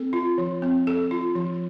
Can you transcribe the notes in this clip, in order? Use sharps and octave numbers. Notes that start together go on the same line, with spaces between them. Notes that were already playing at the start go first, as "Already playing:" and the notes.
Already playing: C4 A4
F4
F3
C4
A4
F4
F3